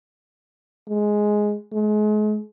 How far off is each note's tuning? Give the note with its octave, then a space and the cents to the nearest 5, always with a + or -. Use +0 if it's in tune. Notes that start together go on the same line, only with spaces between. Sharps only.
G#3 +5
G#3 +35